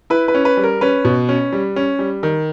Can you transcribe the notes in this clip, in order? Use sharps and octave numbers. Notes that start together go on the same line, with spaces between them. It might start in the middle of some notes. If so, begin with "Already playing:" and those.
E4 B4
B4
C#4
B4
G3
A#4
C#4 B4
B2
C#4
G3
C#4
G3
D#3